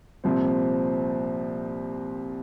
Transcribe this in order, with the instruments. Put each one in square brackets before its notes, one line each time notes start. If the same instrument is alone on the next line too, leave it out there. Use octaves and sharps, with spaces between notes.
[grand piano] C2 A#2 F3 C4